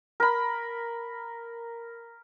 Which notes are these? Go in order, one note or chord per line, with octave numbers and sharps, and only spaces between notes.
A#4 B5